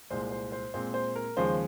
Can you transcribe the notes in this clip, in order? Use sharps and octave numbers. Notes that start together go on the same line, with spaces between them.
C2 A#2 G#3 C5
C5
C5
A#2 G#3 C4 C5
C5
A#4
D#2 C#3 F3 G#3 C5